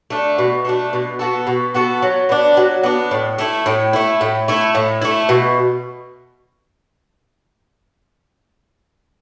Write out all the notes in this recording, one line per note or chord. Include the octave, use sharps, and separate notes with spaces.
A3 D4
B2
A3 D4
B2
B3 F#4 A4
B2
B3 F#4 A4
F#3
B3 D4
F#3
B3 D4
A2
A3 E4
A2
A3 E4
A2
A3 E4
A2
A3 E4
B2